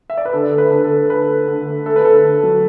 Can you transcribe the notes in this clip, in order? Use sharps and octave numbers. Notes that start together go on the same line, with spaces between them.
E5
D5
B4
D3 A4
A3
B4
D3 B4
A4
A3
D3 B4
A3
D3
A3
A3 A4
B4
D3 A4
D3
F#3